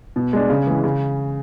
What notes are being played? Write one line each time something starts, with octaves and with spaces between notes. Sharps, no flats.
B2
G#3 D4
C#3
E3 G#3
C#3